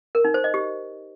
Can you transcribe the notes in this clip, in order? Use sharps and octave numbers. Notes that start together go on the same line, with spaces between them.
A#4
D#4
C5
D#5
G4